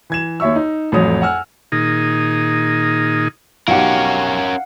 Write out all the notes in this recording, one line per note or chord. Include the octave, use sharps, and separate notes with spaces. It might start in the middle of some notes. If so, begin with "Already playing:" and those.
E3 G#6 E7
D#2 C#5 E5 C#6 E6
D#4
A1 F2 F#3 D#6
F#5 G#5 E6 F6
A#2 D#3 D#4 G#4
B1 C#4 G4 A#4 F5 F#5